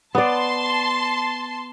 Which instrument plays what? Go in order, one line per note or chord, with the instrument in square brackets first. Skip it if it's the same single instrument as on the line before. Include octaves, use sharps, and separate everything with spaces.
[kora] B3 D5 [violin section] A5 C6